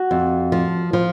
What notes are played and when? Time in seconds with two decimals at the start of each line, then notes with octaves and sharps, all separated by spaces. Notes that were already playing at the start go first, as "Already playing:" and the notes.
Already playing: F#4
0.11 F2
0.52 F3
0.93 F3